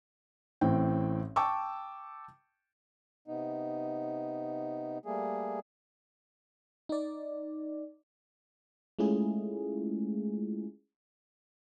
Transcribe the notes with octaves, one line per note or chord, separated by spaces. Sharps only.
A1 A2 C4 G5
G5 A5 C#6 D6 E6
C3 B3 D#4
G3 A3 A#3 G#4
D#4 D5
G#3 A3 C#4 E4 F4 G#4